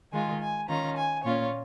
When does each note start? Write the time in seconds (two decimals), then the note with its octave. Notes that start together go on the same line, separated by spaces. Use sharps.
0.12 D#3 G#3 F4 G#5
0.40 G#5
0.69 D#3 C#4 F4 A#5
0.97 G#5
1.24 A#2 A#3 C#4 F4 C#5